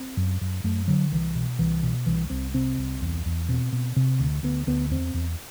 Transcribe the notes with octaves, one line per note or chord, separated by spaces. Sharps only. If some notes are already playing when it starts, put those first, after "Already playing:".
Already playing: C4
F#2
F#2
F#2 A3
D3 F#3
C2 E3
B2
C2 E3
B2
C2 E3
C2 C4
C3 C4
C2
E2
E2
B2 C4
B2
C3
D2
D2 B3
D2 B3
E2 C4
E2